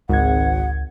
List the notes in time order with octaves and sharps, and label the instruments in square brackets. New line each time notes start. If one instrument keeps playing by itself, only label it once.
[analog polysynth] G#1 [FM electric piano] C#2 G#6 [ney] F#5